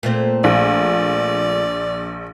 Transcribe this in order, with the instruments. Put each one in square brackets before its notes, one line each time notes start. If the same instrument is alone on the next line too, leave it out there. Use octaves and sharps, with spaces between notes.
[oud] A#2 A3 C4
[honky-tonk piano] A#1 [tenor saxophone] D5